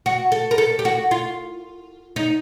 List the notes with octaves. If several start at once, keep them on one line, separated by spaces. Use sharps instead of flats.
F#4
A4
A#4
A4
G4
F#4
F4
D#4